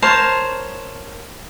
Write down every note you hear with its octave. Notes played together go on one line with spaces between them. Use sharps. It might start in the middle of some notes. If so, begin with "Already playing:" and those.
A#4 C5 C#5 A5